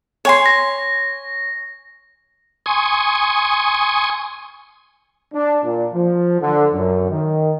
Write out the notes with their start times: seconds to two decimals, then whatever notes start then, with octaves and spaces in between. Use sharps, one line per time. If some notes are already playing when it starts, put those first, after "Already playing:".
0.25 C#5 G#5 C6
0.46 A#6
2.66 G#5 C6 C#6 D#6
5.34 D4
5.64 A#2
5.94 F3
6.41 D3
6.73 F#2
7.10 D#3